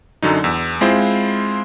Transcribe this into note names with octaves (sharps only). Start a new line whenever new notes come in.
F#2 D3 F#3 D#4
E2 E6
G#3 C4 E4 F4 C5